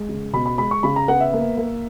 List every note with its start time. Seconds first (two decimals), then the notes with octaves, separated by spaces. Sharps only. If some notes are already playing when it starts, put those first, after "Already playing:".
Already playing: G#3
0.09 C#3
0.33 B2 B5
0.46 B5
0.58 G#3 B5
0.71 C#6
0.83 C#3 B5
0.96 A#5
1.08 B3 F#5
1.20 E5
1.33 A#3
1.58 A#3